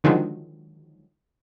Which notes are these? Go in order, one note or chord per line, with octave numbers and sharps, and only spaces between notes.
D3 D#3 F3 F#3 G#3